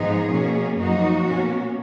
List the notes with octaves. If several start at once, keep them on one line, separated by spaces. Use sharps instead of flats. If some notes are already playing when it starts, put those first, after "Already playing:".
Already playing: G#2 F3 B3 D#4 G#4
B2 A#3 C#4
F#2 F3 A#3 D#4 F#4
B2 A#3 C#4